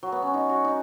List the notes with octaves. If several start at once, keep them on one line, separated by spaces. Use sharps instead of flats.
F#3
B3
C#4
D#4
F#4
D#4